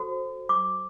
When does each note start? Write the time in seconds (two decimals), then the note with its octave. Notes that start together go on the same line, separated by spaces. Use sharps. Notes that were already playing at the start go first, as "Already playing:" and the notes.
Already playing: F#4 A4 C5
0.49 D6